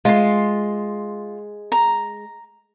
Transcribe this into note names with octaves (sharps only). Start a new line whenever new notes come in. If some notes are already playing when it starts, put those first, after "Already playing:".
G#3 F4 C6
A#5